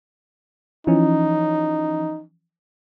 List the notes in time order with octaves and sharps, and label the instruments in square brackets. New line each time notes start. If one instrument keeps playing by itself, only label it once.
[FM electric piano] E3 F3 C#4 [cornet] D#4